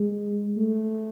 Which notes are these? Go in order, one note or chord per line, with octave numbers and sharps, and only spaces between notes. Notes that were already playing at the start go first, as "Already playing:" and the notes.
Already playing: G#3
A3